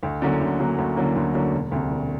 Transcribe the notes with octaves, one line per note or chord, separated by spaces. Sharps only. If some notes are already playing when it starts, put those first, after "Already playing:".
D2
D3 F#3 A#3 C#4
D2
D3 F#3 A#3 C#4
D2
D3 F#3 A#3 C#4
D2
D3 F#3 A#3 C#4
E1
D2 C3
E1